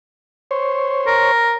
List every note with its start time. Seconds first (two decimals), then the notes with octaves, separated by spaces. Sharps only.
0.51 C5 C#5
1.07 A#4